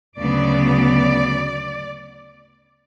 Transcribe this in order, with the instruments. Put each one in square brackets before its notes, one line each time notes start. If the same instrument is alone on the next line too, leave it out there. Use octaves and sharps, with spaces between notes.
[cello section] D2 C#3 F#3 B3 D5